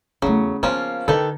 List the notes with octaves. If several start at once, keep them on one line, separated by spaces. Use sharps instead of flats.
E2 C#3 F#3 A3
F3 A#3 B3 C#4
D3 D#3 G4 A4 B4